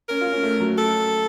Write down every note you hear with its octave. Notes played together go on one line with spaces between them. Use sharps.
C#4 A#4
F4
C#4
A3
F#3
A4